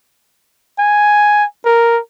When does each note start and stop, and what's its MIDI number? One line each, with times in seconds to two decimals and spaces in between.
0.79 1.45 80
1.65 2.00 70